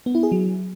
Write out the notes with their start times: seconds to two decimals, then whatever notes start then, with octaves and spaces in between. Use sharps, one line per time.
0.06 B3
0.15 E4
0.23 G#4
0.32 F#3